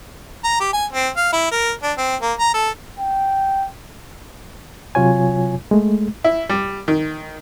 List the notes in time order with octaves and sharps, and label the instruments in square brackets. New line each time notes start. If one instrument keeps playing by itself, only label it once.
[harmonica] A#5
G4
G#5
C4
F5
E4
A#4
D4
C4
A#3
A#5
A4
[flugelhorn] G5
[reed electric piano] C3 F#3 F4 C#5 G#5
G#3 A3
[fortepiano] E4
G3
D#3